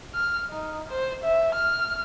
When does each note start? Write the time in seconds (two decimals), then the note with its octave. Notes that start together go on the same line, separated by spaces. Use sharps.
0.15 F6
0.50 D#4
0.90 C5
1.24 E5
1.55 F6